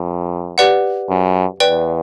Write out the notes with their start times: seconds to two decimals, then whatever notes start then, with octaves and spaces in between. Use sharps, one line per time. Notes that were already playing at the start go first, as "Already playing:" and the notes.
Already playing: F2
0.58 G4 B4 D5 F#5
1.09 F#2
1.60 E2 B4 D5 G5